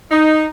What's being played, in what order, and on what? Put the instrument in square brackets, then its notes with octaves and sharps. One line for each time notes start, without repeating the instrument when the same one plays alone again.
[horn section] D#4